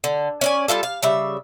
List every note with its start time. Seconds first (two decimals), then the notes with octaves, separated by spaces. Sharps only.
0.04 D3
0.41 C#4 D5 G#5
0.68 G3 A#3 F4 A4
0.83 F5
1.03 C#3 G3 E5